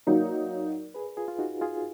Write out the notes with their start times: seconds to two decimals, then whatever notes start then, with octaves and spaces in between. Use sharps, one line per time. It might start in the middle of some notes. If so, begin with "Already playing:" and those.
0.07 F#3 A#3 D#4 A#4 D5
0.94 G#4 B4
1.17 F4 G#4
1.28 F4
1.39 D#4 F#4
1.61 F4 G#4